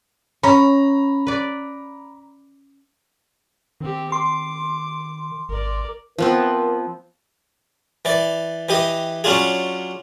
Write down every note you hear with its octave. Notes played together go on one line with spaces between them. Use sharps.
C#4 A#5 B5
B4 D5
D#3 C4 G4
C6 D6
G#1 A#4 D5
F3 B3 C4 A#4
E3 D5
E3 G4 D#5
F#3 C#4 D4 F4 G#4